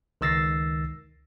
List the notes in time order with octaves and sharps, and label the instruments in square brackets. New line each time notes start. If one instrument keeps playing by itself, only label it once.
[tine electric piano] C#2 D#3 E6 A6 A#6 C7